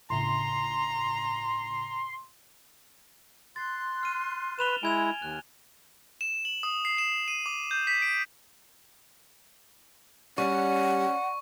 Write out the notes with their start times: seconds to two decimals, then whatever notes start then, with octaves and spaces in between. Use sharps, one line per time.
0.10 G1 A2 C#3 A#5 C6
3.56 C6 F#6 A6
4.03 F6 D#7
4.59 B4 E7 F7 G7
4.83 G#3 E4 G#5 G#6 F7
5.22 D#2 F#6
6.21 E7
6.45 F#7
6.63 D#6
6.85 C7
6.98 E7
7.28 D#7
7.46 D6
7.71 G6
7.87 B6
8.02 D7
10.38 G3 C#4 F#5 C#6